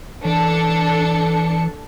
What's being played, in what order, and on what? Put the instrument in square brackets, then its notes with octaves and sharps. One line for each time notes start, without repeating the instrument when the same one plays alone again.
[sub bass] E3 [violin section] D4 A4 C#7